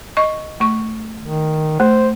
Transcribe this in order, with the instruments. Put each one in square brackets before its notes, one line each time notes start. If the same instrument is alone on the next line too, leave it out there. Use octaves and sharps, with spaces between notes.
[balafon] D#5 C#6
A3 C#6
[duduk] D#3
[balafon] A3 [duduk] C5